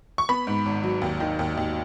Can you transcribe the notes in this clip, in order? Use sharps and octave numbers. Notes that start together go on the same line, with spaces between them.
C#6
B3 B5
G#2
G#1
F#3
D#2
D#3
D#2
D#2